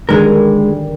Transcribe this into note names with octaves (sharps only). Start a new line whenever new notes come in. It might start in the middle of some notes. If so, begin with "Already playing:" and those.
D3 D#3 G3 G#3 A#4